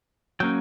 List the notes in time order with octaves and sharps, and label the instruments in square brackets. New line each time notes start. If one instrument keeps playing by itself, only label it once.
[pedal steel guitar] F#3 A#3 C#4 G5